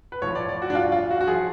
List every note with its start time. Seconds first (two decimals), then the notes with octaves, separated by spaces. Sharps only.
0.12 B4
0.22 A2 F3 C#5
0.35 D5
0.49 D5
0.62 F#4
0.70 D4
0.75 F4
0.92 F4
1.11 F#4
1.21 F#4
1.27 F3 G#4